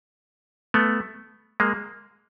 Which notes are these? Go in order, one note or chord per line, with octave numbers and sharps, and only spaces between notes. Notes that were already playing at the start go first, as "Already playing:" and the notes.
A3 B3
G#3 A#3